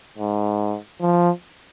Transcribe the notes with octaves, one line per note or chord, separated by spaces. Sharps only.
G#2
F3